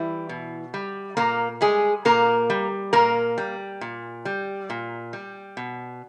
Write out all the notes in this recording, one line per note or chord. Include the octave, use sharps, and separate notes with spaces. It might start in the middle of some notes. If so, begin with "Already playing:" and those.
Already playing: E3 G3 E4
B2
G3
A#2 A#3 A#4
G3 G#3 G#4
A#2 A#3 A#4
G3
A#2 A#3 A#4
G3
A#2
G3
A#2
G3
B2